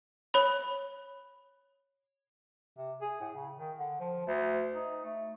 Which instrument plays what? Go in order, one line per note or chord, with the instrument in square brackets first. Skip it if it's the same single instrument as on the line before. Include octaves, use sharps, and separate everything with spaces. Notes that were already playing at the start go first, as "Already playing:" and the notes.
[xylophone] C#5 B5
[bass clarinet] C3
G#4
A2
C#3
D#3
D3
F3
D2
D#4
A3